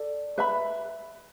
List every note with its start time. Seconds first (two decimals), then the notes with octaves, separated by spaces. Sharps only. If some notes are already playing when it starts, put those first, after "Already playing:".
Already playing: A4 D5
0.38 B4 E5 B5